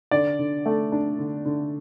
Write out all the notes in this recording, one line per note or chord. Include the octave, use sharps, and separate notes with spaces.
D3 D5
D3
A3
D4
D3
D3